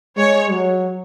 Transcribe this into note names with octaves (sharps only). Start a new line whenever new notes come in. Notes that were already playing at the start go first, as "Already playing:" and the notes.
G#3 C#5
F#3